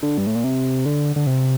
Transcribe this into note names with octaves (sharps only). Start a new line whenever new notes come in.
D3
G2
A2
A#2
C3
D3
D3
C3